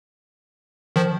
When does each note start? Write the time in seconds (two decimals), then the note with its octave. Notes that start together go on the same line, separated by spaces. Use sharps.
0.96 D#3 F3